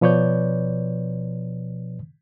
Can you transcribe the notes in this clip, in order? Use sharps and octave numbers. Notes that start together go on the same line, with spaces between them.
B2 F3 B4 C#5 D5 G6